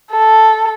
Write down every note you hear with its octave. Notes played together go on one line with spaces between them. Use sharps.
A4